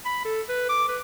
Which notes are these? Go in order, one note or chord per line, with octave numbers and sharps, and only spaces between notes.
B5
A4
B4
D6
B4